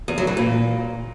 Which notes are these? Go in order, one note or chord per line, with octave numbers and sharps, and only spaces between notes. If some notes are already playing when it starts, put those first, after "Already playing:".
E2
F#3
E3
A#2